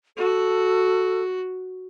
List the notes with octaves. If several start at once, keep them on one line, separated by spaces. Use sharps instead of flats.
F#4 A4